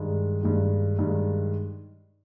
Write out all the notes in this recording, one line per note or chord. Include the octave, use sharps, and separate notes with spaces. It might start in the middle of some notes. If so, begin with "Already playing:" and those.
Already playing: G2 D#3 G#3
G2 D#3 G#3
G2 D#3 G#3